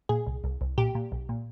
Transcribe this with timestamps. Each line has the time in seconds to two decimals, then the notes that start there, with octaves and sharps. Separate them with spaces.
0.09 A#2 G#4
0.27 C2
0.44 C2
0.61 C2
0.78 A#2 G4
0.95 A#2
1.12 B1
1.29 A#2